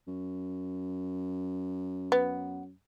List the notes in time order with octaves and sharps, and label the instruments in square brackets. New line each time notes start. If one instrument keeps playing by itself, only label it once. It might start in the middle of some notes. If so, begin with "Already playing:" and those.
[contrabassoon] F#2
[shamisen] B3